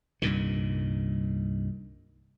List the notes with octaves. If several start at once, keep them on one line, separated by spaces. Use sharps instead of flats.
C2 G2 A#2 D#3